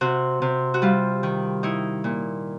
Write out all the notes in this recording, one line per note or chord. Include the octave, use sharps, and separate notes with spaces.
C3 F#4
C3
F#4
G3 F4
D#3
D#4 E4
A#2